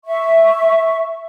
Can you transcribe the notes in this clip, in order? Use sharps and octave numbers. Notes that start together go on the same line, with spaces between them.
E5 C#6